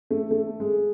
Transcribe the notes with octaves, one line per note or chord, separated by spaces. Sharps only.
A3
A3
G#3